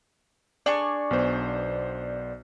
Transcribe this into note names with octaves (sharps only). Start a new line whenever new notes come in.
D4 G#4 D5 C#6
B1 B3 C5